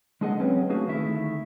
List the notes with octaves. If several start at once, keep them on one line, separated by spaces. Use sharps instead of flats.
G#3 D4 G#4 D#5 F#5
F#3 C4 C#4 B4 C#5
A3 D4 F#4 G#4 F5
D2 D#3 A3 E4 E5